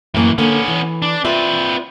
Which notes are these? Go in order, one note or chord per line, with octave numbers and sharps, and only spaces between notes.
F#2 A2 E3 A#3
D3 A#3 B3 C#4
E3
D4
C4 F4 B4 D5 E5